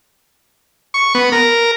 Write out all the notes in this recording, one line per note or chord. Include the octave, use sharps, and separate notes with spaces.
C#6
B3
A#4